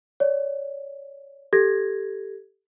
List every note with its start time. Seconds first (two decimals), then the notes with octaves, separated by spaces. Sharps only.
0.20 C#5 D5
1.53 G4 A4 G#6 A#6